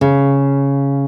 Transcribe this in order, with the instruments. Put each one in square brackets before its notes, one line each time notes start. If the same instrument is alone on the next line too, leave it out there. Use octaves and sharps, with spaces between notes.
[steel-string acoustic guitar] C#3